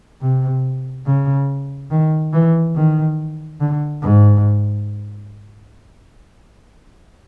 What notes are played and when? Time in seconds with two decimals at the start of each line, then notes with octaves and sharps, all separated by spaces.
0.21 C3
1.06 C#3
1.90 D#3
2.33 E3
2.75 D#3
3.60 D3
4.02 G#2